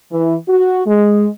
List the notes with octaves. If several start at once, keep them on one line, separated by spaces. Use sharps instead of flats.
E3
F#4
G#3